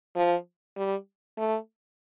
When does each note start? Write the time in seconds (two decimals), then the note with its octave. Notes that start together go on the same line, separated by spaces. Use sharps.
0.16 F3
0.77 G3
1.38 A3